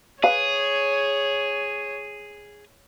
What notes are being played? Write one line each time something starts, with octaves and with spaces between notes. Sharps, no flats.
G#4 B4 C#5 F5